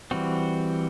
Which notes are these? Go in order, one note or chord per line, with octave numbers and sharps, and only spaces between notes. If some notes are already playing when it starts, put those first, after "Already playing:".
E3 G3 C4 F#4